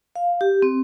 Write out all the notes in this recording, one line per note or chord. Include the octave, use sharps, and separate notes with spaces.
F5
G4
C4